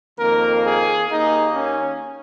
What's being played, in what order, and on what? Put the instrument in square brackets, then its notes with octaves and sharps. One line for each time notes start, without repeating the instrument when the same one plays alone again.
[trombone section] F2 D#3 A#3 A#4
G#4
D#2 D#3 A#3 D#4
C#4